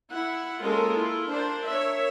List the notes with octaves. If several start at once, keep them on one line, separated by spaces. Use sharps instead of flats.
E4 F#5
G#3 A#3 C#4 F4 A4 A#4
E4 F4
D4 A#4 C5
A#4 C#5 E5